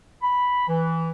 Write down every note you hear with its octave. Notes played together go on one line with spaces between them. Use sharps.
B5
E3